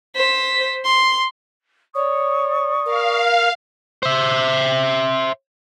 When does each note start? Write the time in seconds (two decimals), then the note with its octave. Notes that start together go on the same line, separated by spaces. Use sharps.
0.16 C5 B6
0.85 C6
1.95 C#5 D5 C#6 D#6
2.85 A#4 F5
4.03 C5 E5